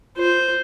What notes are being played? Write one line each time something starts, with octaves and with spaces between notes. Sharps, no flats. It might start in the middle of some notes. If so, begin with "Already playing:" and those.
F4 C5